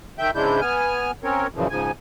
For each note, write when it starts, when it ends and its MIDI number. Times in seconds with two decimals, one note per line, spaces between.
0.19 0.31 51
0.19 0.31 76
0.19 0.31 79
0.19 0.31 91
0.35 0.61 44
0.35 0.61 49
0.35 0.61 56
0.35 0.61 62
0.35 0.61 64
0.35 0.61 91
0.61 1.11 59
0.61 1.11 80
0.61 1.11 89
1.24 1.47 60
1.24 1.47 61
1.24 1.47 70
1.24 1.47 73
1.55 1.68 42
1.55 1.68 46
1.55 1.68 49
1.55 1.68 52
1.55 1.68 53
1.70 1.91 44
1.70 1.91 49
1.70 1.91 53
1.70 1.91 80